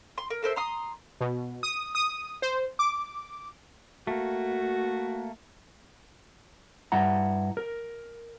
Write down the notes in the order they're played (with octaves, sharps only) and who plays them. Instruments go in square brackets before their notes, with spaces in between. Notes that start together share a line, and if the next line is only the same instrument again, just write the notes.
[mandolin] C6
A#4
A4 A#4 C5 E5
A#5 C6 D#6
[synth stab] B2
D#6
D#6
C5
D6
[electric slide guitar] A3 A#3 [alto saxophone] F#4
[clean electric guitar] G2 E4 F#5 A#5
A#4